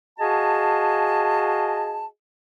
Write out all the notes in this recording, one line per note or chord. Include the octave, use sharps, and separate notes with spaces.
F#4 G#4 D#5 F5 G#5 A5